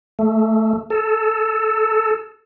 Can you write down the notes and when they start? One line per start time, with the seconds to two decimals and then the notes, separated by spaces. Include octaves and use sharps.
0.19 A3
0.90 A4